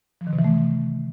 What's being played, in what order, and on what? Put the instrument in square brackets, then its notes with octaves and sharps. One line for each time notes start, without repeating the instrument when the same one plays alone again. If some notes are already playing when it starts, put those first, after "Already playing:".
[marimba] F3
D#3
C3
E3
A3